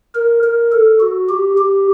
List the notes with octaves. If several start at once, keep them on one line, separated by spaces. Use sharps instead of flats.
A#4
A#4
A4
F#4
G4
G4